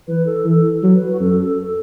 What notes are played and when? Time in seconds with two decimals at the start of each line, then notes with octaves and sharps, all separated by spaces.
0.08 E3 B4
0.26 A4
0.45 E3 A4
0.82 F#3
0.95 B4
1.12 F#4
1.20 F#2 A4
1.39 A4
1.57 A4